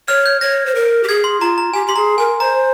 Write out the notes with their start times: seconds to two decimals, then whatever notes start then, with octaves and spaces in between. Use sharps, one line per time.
0.08 C#5 F6
0.26 G6
0.41 C#5 A#6
0.66 C5
0.75 A#4
1.03 G4
1.08 G#4 G#6
1.24 C6
1.40 F4 A#5
1.58 A#5
1.74 G4 G#5
1.87 G4 C6
1.96 G#4 A#5
2.18 A#4 G#5
2.40 C5 A#5